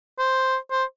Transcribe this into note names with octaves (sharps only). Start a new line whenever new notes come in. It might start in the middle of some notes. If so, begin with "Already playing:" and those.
C5
C5